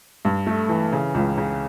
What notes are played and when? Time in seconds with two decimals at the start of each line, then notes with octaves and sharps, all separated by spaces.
0.25 G2
0.47 A3
0.69 E3
0.92 C#3
1.15 C#2
1.38 C#3